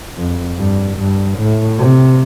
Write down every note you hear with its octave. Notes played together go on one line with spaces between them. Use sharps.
F2
G2
G2
A2
C3